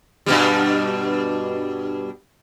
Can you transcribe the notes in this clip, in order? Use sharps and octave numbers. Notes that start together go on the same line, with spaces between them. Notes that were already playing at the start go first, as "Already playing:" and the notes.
G2 B2 G3